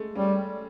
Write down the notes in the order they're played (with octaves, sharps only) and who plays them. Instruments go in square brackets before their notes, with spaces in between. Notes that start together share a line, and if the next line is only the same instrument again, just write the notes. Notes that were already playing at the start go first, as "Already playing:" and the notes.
Already playing: [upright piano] G#3 A3
[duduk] G3 [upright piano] C#4